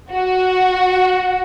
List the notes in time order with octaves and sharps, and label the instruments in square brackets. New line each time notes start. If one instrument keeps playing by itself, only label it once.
[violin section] F#4